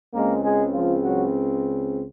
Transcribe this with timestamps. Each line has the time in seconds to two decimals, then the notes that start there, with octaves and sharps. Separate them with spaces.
0.14 C#2 C#3 G#3 A#3 C4 A#4
0.44 G#3 G#4
0.74 F3 F4
1.03 F#3 F#4